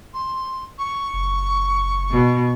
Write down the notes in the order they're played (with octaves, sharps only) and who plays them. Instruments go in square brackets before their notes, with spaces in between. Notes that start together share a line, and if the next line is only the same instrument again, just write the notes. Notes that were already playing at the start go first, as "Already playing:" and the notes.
[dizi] C6
C#6
[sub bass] F#1
[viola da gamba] B2